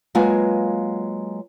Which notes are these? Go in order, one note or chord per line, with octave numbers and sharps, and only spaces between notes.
F#3 G#3 A#3 F4 B4 G#5